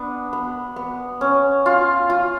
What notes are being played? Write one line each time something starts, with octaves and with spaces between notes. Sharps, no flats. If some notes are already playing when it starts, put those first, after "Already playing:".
Already playing: B3 D4
B3
B3
C#4
F4
F4